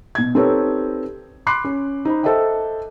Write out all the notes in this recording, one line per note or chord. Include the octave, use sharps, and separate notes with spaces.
B2 G#6
C4 D#4 G4 A4 B4 C#5
B5 C6 D6 F#6 C7
C#4
D#4 C5 B5
A4 C5 D#5 E5 G5